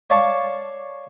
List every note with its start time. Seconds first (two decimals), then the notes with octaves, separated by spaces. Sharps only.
0.10 C#5 D5 F5 A5 C#6